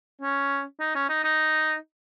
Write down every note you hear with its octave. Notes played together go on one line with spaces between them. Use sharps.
C#4
D#4
C#4
D#4
D#4